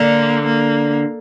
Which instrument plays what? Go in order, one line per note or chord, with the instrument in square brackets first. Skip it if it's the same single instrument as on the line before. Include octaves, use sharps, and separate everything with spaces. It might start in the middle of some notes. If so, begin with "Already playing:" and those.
Already playing: [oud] D3 [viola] A#3
[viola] A#3